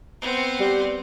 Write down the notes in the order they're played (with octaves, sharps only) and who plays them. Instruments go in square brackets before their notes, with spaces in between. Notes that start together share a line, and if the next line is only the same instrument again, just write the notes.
[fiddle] B3 C4
[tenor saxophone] G3